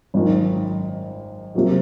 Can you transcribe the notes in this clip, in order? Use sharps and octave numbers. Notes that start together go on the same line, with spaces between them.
G#1 F#2 D#3
C3 F#3 A#3